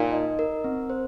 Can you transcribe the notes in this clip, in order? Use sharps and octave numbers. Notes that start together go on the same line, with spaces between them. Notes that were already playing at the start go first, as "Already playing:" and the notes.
Already playing: A#2 D#4
D#5
A#4
C4
C5